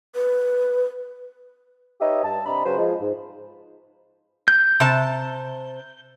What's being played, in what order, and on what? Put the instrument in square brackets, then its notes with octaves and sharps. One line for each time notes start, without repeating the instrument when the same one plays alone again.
[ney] B4
[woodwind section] D#4 G4 B4 C#5 D#5 E5
G2 A5
C3 D4 D#5 A#5 B5
C#3 F#3 B4 C5
F3 G#3
G#2
[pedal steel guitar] G6
[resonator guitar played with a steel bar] C3 A5